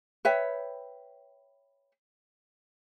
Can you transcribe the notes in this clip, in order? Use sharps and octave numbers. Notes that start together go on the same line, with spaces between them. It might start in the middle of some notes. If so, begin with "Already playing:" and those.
B4 C#5 E5 G5